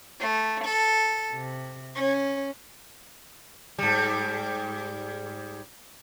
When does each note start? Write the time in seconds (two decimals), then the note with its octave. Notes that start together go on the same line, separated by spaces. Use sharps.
0.19 A3
0.63 A4
1.34 C3
1.95 C#4
3.79 G#2 G3